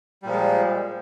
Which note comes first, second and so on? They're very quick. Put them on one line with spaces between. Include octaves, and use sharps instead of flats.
G3 A#2 F3 G#3